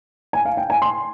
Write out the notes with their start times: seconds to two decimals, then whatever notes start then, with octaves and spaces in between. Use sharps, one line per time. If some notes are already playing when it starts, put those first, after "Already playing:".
0.33 G#5
0.45 F5
0.57 G5
0.70 G#5
0.82 C6